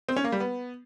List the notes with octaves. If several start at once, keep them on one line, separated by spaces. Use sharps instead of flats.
C4
C#4
A#3
G3
B3